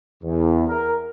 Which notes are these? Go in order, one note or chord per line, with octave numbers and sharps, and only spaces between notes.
E2
A#4